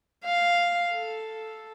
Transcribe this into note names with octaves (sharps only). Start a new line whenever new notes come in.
F5
A4